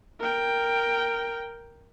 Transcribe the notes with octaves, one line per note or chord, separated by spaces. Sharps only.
A#4 G5